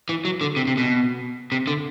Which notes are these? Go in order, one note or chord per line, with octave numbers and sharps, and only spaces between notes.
E3
F#3
D3
C3
C3
B2
C3
D3